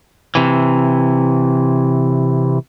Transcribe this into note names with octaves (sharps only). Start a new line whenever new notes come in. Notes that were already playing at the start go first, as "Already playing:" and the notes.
C3 E3